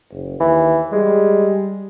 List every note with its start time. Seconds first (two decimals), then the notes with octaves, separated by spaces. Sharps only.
0.11 F#1
0.40 D#2 E3
0.92 G3 G#3